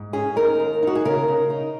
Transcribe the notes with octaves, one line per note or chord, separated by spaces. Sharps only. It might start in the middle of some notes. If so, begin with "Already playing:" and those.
Already playing: G#2
C#4 G#4
D#4 A#4
D#2
D#4 F#4
G#4
C#3 A#4
C#3
D#4